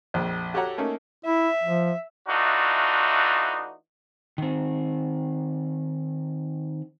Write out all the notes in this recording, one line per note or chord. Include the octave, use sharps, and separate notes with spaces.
A#1 F2 G5
F#4 G4 A4 C#5 F#5 A#5
A3 A#3 C#4 D#4
E4 E5
F3
E3 A3 D4 D#4 F4 F#4
D#3 C4